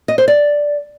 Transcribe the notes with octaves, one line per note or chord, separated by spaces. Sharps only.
D#5
C5
D5